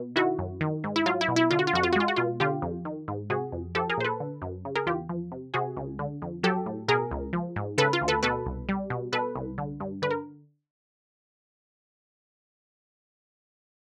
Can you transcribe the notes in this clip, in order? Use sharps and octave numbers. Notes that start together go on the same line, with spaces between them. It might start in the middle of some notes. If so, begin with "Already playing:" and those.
Already playing: B2
D#3 E4 F#4
F#2
D#3
G#2
E4
F#3 F4
E4
B2
E4
D3 F4
F#4
F4
F2 F#4
F4
F#4
G#3 F4
F#4
B2 F4
D3 F4 G4
F2
D#3
G#2
C3 F#4 G#4
F2
F3 G4 A4
G#4 A#4
A#2 C5
A4 B4
D3
F#2
C#3
G#4 A#4
E2 F4 G4
F3
C3
C3 F#4 G#4
C#2
D3
F2
F#3 G4 A4
A2
B2 G#4 A#4
C#2
F3
G#2
C#3 A4 B4
F4
D2
A4 B4
B2 A4 B4
C2
G3
B2
B2 A4 B4
C2
D3
G2
D3 B4
A#4